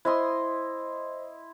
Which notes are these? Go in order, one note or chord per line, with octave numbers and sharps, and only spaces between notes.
E4 C5 D#5 C6